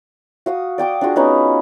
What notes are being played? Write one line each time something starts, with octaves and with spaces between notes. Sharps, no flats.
F#4 F5 D#6
D5 G5 D6 D#6
D4 F4 F#4 G#4
B3 C#4 D#4 B4